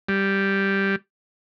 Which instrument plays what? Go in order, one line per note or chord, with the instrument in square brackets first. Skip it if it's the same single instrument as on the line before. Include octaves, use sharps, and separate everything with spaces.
[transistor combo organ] G3